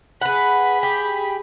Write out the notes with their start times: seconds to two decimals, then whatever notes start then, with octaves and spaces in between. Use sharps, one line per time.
0.21 G#4 B4 F#5 B5
0.83 G4